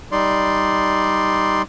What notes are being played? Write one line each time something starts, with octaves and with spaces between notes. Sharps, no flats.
G3 D#4 D5 C6